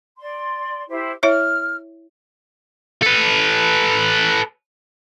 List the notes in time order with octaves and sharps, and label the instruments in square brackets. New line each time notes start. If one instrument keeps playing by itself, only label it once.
[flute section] D5 C6
E4 G4 C5
[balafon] E4 C#5 E5 [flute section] F6
[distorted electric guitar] A4 B4